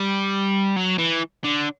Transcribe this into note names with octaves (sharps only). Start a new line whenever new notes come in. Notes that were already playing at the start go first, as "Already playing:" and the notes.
Already playing: G3
F#3
E3
D3